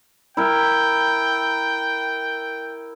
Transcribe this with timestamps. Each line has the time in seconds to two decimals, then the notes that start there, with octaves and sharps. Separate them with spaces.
0.37 E4 A#4 G5